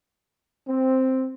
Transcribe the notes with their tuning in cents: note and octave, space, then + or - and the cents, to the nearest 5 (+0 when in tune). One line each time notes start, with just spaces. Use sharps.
C4 +0